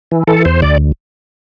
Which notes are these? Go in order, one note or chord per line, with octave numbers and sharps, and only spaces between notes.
E3
E3 A4
E2 C5
D2 D5